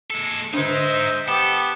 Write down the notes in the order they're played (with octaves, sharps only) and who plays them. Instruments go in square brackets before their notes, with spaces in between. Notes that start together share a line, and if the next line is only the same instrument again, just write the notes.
[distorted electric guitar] G#3 A4
[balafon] D3 D4 [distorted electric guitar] G#3 D#4 [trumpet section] C5 D#5 E5
[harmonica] B3 G4 [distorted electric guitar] A4